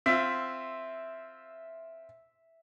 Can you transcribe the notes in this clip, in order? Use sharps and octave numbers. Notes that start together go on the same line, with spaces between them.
C4 F4 E5